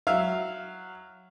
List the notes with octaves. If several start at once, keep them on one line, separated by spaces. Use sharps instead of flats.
F#3 E5 F5